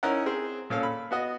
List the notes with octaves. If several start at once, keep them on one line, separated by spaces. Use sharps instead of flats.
C#4 D#4 E4 A#4 F#5
C4 G#4 C5
A#2 C#4 A4 F5
B5
B3 F#4 D#5